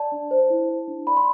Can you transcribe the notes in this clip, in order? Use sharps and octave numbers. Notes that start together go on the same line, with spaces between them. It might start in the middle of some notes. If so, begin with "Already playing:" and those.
Already playing: D5 A5
D4
C5
E4
C5
D4
D5 B5
C6